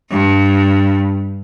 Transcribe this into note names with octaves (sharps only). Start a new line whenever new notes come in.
G2